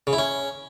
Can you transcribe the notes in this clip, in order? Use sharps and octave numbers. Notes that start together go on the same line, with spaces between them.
C#3
E4
C#4